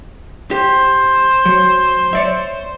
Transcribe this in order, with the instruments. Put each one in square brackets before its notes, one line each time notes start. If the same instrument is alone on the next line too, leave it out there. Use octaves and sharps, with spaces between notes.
[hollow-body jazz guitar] G4 [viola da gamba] C5
[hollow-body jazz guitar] F#3
C#5 D5 E5